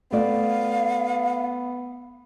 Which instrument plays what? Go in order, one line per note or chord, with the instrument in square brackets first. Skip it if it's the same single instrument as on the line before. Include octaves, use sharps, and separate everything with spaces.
[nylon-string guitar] A3 D5 [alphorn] B3 [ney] F5